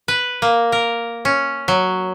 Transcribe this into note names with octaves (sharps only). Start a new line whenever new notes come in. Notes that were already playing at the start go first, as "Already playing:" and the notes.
B4
A#3
A#4
C#4
F#3